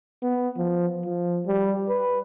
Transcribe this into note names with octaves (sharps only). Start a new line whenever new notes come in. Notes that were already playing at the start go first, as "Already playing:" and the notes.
B3
F3
F3
G3
B4